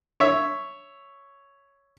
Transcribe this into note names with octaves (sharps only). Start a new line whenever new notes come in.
C#5 E5